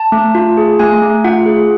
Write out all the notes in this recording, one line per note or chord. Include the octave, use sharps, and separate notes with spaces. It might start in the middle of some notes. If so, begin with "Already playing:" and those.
Already playing: A5
A3
F4
G#4
A3 G#5
A3
F4 F#5
G#4